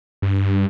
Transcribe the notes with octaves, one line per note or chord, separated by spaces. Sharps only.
G2